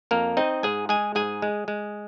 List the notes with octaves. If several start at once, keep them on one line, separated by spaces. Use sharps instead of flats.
F2 A#3 A#4
C4 D#4 D#5
G#2 G#4 G#5
G#3 G#4 G#5
G#2 G#4 G#5
G#3
G#3